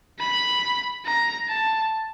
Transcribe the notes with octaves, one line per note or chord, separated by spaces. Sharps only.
B5
A#5
A5